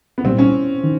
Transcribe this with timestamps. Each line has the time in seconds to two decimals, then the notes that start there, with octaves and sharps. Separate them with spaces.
0.18 B3
0.24 C2 A#2 G3 C4
0.38 C#4
0.84 D#3